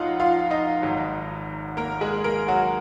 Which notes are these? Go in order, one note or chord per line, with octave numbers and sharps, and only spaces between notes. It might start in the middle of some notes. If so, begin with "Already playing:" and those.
Already playing: A#1 G#2 F#3 D#4 F4 D#5 F5 F#5
F4 F5
D#4 D#5
G#1 G#2 F#3
A#3 A#4
G#3 G#4
A#3 A#4
F#3 F#4